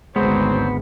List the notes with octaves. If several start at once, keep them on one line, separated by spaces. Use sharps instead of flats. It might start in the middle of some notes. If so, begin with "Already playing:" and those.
G#1 D2 F#3 G#3 B3 C4 C5